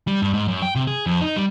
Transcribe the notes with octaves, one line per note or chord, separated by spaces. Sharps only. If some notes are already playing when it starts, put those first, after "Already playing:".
G3
G2
G#2
F#2
G5
C3
G#4
F2
D#4
G3